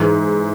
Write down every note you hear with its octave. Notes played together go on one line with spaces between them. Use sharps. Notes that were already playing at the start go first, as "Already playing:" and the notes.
Already playing: G#2 E3